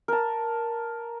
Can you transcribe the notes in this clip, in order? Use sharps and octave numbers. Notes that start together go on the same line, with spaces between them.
A#4 A5